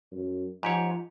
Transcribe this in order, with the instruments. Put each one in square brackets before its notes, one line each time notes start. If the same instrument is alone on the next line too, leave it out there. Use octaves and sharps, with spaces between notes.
[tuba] F#2
[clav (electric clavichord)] G#2 G4 C#5 [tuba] F3